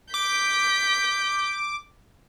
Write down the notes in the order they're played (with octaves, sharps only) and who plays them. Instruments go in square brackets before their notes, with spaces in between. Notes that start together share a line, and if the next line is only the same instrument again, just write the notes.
[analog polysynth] D6 [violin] G6 B6